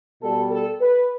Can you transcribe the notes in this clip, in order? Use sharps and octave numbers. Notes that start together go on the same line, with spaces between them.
B2 G3 A4
A4
B4